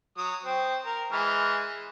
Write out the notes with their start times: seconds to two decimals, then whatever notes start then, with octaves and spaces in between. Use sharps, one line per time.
0.17 F#3 D#6
0.45 C4
0.85 A#4
1.12 E3 G#3 F6